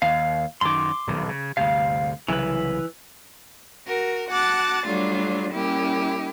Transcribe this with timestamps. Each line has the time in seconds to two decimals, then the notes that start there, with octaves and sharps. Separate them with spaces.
0.02 D#2 F5
0.61 F#2 D#3 C6 D6
1.07 D#1 B1 D#3
1.29 C#3
1.57 D2 G2 C3 F5
2.28 C2 C#3 E3 F#3 B4
3.87 F#4 A#4
4.29 F#4 F#5 A5 D6 F#6 A6
4.87 F#3 G3 A3 D4 F4
5.51 A#2 G3 C#4 E4 G4